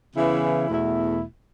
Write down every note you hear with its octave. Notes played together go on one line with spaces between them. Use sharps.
C#3 E3 B3 E4
E2 B2 A3 E4